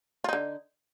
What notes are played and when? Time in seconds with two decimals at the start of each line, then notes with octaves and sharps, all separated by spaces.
0.24 F4
0.29 D#4
0.33 D3